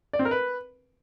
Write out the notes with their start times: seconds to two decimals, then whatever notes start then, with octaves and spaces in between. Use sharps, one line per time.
0.13 D5
0.19 C4
0.25 A#4
0.31 B4